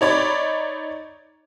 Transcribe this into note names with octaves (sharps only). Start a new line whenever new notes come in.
D#4 C#5 D5 B5